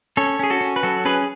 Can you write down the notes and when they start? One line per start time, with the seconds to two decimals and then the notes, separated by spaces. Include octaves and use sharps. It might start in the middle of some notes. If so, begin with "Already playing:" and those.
0.17 C#4 A4 C#5
0.39 C#4 G#4
0.50 F#4 A4
0.61 C#4
0.76 B4
0.83 F#3 F#4 A4
1.05 C#4 G#4 B4